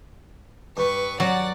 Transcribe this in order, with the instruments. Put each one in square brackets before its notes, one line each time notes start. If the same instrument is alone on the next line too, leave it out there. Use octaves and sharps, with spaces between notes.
[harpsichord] G2 [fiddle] B4 C#6
[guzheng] F#3 [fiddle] D5 F#5